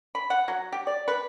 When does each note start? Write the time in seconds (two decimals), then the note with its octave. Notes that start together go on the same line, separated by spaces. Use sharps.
0.15 B5
0.30 F#5
0.48 F#3
0.72 G4
0.87 D5
1.08 B4